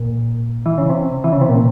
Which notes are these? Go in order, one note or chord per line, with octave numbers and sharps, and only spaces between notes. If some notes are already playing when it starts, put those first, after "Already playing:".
Already playing: A#2
E3
C#3
C3
E3
C#3
C3
A#2